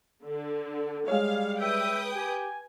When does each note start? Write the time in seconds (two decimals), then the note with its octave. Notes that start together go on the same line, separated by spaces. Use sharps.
0.23 D3
1.08 G3 G#3 C#5 F5
1.61 B4 E5 G5 D#6
2.16 G4 G#5